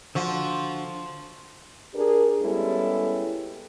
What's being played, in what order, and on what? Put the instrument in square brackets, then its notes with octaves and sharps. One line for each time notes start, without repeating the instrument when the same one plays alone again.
[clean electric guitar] D3 F#4 [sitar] F3
[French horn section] D4 G4 G#4 A#4
G3 G#3 B3 C#4 E4 A4